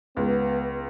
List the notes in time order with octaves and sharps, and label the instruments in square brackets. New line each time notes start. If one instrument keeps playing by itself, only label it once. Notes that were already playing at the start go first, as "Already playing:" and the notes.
[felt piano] C#2 [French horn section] B3